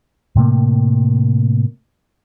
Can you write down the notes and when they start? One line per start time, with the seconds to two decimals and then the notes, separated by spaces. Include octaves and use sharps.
0.36 A2 C3 A3 A#3